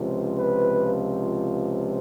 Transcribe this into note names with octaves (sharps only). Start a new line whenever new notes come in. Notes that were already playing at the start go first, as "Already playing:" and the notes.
Already playing: C#2 C3 F3
B4